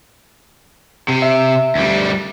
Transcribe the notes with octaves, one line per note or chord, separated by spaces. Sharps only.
C3
E5
D2 G3